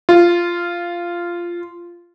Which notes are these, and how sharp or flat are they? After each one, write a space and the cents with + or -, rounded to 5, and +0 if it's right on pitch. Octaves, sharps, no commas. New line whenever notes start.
F4 -10